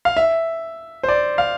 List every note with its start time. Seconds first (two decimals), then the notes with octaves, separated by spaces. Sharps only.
0.05 F5
0.17 E5
1.03 C5
1.09 D5
1.38 F5